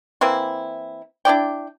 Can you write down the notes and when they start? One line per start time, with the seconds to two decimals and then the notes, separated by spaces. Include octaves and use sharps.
0.21 E3 A#3 C4 E4
1.25 D4 E4 D5 G5